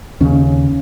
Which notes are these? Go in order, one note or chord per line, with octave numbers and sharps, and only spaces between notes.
D#2 C#3 C#4